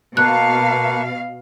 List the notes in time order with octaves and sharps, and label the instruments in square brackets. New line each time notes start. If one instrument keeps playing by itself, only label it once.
[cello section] B2 F5 [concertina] A#3 B4 C#6 [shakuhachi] A5 [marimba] F#6